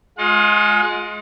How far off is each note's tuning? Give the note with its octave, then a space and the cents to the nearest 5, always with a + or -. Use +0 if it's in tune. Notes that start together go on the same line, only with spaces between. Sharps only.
G#3 +15 F4 +30 F#5 -40